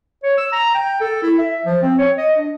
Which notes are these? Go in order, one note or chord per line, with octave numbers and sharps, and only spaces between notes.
C#5
E6
A#5
G5
A4
E4
E5
F3
C4
C#5
D#5
D4